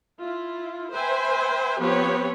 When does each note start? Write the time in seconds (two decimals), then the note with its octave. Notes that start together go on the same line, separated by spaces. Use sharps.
0.20 E4 F4
0.93 B4 C5 E5 G5 G#5
1.80 F3 B3 C4 G4 B4 C#5